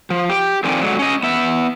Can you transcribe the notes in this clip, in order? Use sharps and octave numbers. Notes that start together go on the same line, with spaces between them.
F3
G4
D3 D#3 F3 C4 D5 G#5
D3 F#3 G#3
C#4 D#5
B3 E5